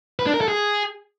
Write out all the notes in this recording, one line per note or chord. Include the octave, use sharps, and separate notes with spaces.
B4
D4
A#4
A4
G#4